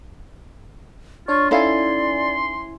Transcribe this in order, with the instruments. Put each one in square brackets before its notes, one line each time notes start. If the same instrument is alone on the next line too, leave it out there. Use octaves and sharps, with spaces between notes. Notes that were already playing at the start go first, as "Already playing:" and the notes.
[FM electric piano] D4 C#5 [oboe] F4 [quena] C#6
[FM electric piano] C#4 E4 G#5 [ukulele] D#4 A4 F5 [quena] D5 [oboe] C6